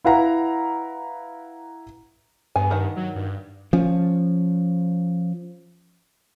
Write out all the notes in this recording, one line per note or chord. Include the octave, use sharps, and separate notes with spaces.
E4 B4 F5 F#5 A#5
G2 B3 G#5
D#3 F#5
F#3
G2
F3 C#4